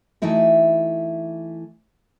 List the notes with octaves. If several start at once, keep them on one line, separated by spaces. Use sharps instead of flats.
E3 A3 D#4 E4 F#4